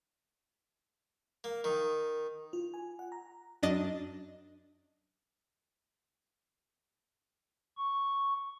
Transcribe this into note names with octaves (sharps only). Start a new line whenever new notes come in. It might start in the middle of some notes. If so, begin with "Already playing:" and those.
A#3
D#3
F4
G#5
F#5
A#5
F#2 D4 D#5 A6
C#6